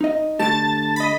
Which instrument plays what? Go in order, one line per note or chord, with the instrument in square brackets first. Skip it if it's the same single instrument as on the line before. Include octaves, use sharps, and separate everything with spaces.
[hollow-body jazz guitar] D#4 D#5
[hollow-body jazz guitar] D3 A3 G4 [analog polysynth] A5 A6
[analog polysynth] D#5 B5